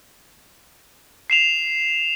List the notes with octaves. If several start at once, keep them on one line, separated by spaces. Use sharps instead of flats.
C7 E7 F7